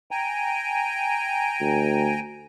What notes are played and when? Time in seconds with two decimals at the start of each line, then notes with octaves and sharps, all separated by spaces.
0.11 G5 G#5 A#5
1.60 D2